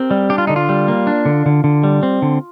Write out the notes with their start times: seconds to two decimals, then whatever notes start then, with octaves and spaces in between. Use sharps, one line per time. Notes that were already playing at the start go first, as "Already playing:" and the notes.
Already playing: C4 G4 A#4
0.11 G3
0.30 D4 G4
0.38 F4
0.47 D3 D#4
0.56 F4
0.69 G3
0.88 A#3
1.07 D4
1.26 D3
1.46 D3
1.64 D3
1.84 G3
2.03 C4
2.22 D3